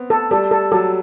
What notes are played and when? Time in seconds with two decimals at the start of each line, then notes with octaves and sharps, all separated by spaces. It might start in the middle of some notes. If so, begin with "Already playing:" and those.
Already playing: B3 C4
0.10 A4
0.31 G3 A4
0.51 A4
0.72 F#3 A4